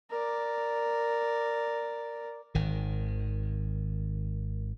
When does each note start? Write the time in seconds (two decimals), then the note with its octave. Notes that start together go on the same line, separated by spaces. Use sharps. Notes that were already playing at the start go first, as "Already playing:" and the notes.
0.11 A#4 D5
2.55 G#1 D#3